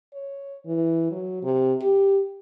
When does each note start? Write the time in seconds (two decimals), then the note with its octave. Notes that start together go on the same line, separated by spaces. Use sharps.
0.14 C#5
0.65 E3
1.11 F#3
1.43 C3
1.81 G4